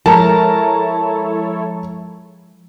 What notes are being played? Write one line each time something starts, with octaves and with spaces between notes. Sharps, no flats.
F3 G#3 E4 A4 A#4 C#5 A5 A#5